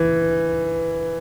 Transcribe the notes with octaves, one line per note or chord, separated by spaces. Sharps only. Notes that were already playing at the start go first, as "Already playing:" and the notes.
Already playing: E3